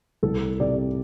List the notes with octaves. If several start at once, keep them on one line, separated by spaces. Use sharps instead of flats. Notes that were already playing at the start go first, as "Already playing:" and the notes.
C2 A4
C3 D5